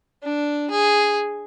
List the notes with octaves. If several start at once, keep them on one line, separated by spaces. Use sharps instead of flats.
D4
G#4